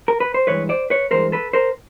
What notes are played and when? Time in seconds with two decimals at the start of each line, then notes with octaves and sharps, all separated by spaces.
0.08 A#4
0.20 B4
0.34 C5
0.47 G2 E3 G#3 B4 C#5
0.69 C5 D5
0.90 B4 C#5
1.11 G2 E3 G#3 A#4 C5
1.32 A4 B4
1.53 A#4 C5